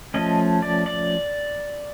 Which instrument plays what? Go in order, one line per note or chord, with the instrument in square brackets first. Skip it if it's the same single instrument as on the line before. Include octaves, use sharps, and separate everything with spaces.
[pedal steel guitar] F3 A3 C#4 D#5
D5
D5